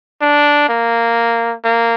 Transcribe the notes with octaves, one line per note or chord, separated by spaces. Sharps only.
D4
A#3
A#3